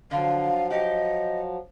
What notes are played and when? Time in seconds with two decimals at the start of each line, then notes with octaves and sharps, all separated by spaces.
0.11 D3 F3 F#3 F5
0.70 G4 D#5